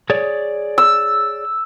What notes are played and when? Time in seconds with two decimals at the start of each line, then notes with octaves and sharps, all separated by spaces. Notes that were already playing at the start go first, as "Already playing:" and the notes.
0.10 G#4 C#5 D5
0.78 E6